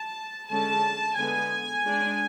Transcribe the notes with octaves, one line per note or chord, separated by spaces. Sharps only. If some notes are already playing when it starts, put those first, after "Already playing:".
Already playing: A5
D3 G#3 C#4 A5
D3 G#3 B3 G#5
G#3 D4